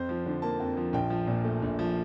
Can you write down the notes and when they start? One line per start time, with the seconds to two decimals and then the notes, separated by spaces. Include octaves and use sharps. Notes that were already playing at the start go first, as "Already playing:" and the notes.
Already playing: F2 C5
0.09 F3
0.26 D3
0.42 A#3 A5
0.60 F2
0.77 F3
0.93 A#1 G5
1.10 F3
1.27 A#2
1.45 A3
1.62 A#1
1.79 F3